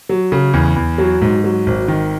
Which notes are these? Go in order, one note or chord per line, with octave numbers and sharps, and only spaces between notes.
F#3
C#3
E2
E2
F#3
G#2
F#3
G#1
D#3